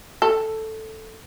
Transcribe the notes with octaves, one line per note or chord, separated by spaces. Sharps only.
A4